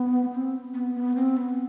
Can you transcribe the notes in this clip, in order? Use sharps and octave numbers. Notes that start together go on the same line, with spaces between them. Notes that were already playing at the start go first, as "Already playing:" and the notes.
Already playing: B3
C4
B3
B3
C4
B3